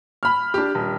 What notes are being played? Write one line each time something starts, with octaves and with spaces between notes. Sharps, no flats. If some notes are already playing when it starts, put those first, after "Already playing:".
B5 F6
D4 G4
D#1